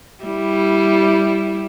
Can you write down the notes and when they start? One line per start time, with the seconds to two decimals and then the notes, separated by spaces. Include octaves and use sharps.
0.25 G3 E4